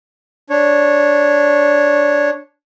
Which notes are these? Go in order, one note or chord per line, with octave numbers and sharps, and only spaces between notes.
D4 C#5